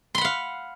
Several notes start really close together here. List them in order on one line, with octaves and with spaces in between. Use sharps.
C6 B5 F#5 F5